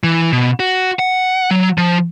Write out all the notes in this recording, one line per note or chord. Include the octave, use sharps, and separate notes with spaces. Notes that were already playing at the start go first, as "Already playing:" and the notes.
E3
B2
F#4
F#5
F#3
F3